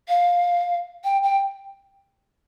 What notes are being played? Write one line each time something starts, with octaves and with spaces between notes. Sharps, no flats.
F5
G5
G5